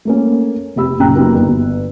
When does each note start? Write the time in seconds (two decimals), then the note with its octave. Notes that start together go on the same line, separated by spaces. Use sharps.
0.05 A3 A#3 C#4
0.76 F1 G4 B5 E6
0.99 A#1 F#2 C#3 G5 A#5 F#6
1.15 F#3 A#3 B3 D#4 G4
1.34 G1 E2